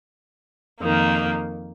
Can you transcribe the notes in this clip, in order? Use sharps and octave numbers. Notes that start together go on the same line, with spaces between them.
F2 D#3 A#3